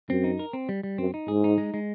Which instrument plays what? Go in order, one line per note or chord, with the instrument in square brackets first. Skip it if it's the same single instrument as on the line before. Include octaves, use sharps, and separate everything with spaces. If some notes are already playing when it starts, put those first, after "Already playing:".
[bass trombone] F#2 [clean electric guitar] C4
[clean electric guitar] D#4
A#4
C4
G3
G3
[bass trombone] F#2 [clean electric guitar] C4
[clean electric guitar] D#4
[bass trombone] G#2 [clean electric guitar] G#4
[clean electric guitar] D#4
G#3
G#3